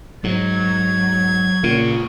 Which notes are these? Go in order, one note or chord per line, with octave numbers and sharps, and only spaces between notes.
G#2 F#3 G#6
A#2 C#3 F4 C#5